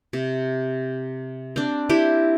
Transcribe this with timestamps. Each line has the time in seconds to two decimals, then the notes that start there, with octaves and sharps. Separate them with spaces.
0.13 C3
1.56 C4 D4
1.89 C4 E4 G4